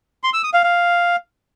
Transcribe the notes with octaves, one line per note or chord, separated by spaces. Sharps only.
C6
E6
D#6
F5
F5